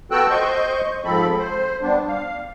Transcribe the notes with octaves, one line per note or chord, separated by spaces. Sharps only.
B3 F#4 A4 G5 E6 F#6
C5 D#5 C#6 G6
G#2 F3 C4 A4 B5
C5
G3 B3 D4
F5